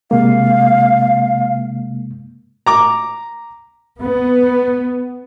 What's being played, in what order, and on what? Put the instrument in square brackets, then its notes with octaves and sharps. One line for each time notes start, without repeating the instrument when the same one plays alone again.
[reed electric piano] C3 G#3 A#3 [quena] F5
[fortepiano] A#5 D6
[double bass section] B3